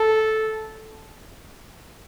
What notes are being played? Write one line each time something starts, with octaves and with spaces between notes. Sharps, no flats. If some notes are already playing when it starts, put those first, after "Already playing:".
Already playing: A4